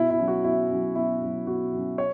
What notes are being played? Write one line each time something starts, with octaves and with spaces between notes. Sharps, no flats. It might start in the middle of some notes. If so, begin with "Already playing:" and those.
Already playing: B2 E4
E4
F#3 C#4
F#4
B2 E4
F#3 C#4
B2 E4
F#3 C#4
B2 F#4
F#3 C#4
C#5